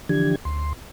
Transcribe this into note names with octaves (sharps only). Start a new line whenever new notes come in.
D3 E3 F3 D4 G4 G#6
D2 C6